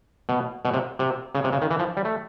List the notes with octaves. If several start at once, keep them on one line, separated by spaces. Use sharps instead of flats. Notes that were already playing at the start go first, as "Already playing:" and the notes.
B2
B2
C3
C3
C#3
C3
C#3
D#3
E3
F3
G3
A3